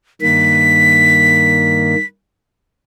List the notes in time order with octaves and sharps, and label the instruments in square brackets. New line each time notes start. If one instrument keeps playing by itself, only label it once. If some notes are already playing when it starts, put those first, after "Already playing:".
[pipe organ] G2 D#3 A#3 [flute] B6